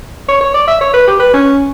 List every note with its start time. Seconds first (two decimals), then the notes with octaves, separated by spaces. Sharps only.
0.29 C#5
0.41 C#5
0.54 D5
0.68 E5
0.81 C#5
0.93 B4
1.07 G4
1.19 B4
1.34 C#4